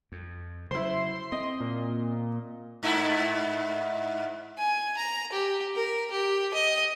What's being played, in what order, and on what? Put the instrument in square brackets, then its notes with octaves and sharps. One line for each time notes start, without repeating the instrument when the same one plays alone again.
[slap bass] F2
[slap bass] C#3 F#3 [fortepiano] E4 C5 [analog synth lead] C6
[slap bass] C4 [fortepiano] D#5
[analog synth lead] A#2
[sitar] G#2 D#4 E4
[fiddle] G#5
A#5
G4
A#4
G4
D#5